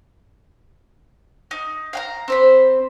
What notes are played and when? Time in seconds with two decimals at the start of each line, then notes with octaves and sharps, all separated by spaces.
1.51 D#4
1.93 F5 G5 A#5
2.28 C4 C5 B5